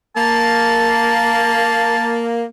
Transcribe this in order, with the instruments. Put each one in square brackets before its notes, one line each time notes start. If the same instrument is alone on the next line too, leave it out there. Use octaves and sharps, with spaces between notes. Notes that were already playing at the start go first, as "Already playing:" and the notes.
[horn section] A#3 [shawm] A5